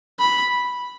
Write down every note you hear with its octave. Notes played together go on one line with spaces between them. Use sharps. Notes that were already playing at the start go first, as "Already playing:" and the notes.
B5